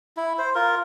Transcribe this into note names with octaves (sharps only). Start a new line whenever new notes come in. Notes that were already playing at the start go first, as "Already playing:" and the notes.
E4
C5
F4 A#4